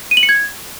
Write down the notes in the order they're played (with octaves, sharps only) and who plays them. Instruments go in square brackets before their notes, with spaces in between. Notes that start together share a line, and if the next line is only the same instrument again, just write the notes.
[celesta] D#7
F#7
C#7
G#6